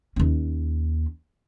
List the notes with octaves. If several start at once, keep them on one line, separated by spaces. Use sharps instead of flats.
D#2 C#4